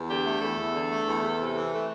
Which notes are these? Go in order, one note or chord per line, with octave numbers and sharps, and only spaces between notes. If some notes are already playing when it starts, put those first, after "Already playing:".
Already playing: E2
D3 G4
A3
E2 A4
E2
D3
A3
E2
E2
C3
E3
A3